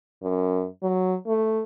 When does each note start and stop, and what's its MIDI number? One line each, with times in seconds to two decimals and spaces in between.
0.23 0.66 42
0.83 1.15 54
1.27 1.62 57